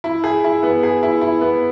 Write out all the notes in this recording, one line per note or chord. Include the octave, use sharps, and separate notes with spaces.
E4
G#4
E4
B3
G#4
E4
E4
B3